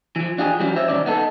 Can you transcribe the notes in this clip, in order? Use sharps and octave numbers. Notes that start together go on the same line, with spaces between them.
E3 F3
D4 F4 G4 G#4
E3 F#3 G3 C#4
C5 C#5 E5
C2 F2 D#3 C#4 D5
B3 D#4 A4